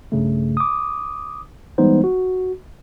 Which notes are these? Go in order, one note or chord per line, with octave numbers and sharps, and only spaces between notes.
B1 G2 C#3 A3
D6 D#6
E3 G3 G#3 B3 D#4 C5
F#4